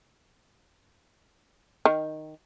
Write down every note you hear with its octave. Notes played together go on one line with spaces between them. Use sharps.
D#3